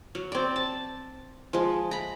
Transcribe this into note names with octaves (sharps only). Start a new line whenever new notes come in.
F#3
C4 D5
A5
F3 G#3
A#5 B5